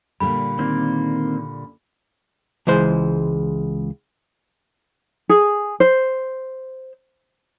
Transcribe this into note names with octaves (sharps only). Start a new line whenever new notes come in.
A#2 D3 G3 B5
D#3 A#3 C4
C#2 E3 G#3 C5
G#4
C5